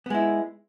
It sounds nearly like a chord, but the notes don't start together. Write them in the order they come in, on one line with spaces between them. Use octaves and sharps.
B3 G#3 E4